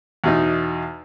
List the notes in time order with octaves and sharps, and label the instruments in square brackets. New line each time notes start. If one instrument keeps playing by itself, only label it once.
[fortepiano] E2 B2 D#4